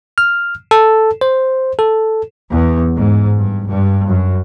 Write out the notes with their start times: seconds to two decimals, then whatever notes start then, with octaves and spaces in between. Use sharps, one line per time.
0.18 F6
0.71 A4
1.21 C5
1.79 A4
2.51 E2
2.94 G#2
3.38 G2
3.69 G2
4.10 F#2